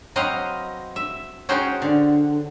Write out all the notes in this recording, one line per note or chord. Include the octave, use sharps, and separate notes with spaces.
F#3 C4 B4 D#5 F5
E5
C#4 D#4 F#4 G#4 C5 G5
D3